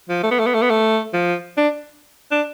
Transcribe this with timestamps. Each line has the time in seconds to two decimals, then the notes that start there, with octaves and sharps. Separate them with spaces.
0.09 F3
0.23 A3
0.31 B3
0.39 A3
0.47 B3
0.54 A3
0.62 B3
0.70 A3
1.13 F3
1.57 D4
2.31 D4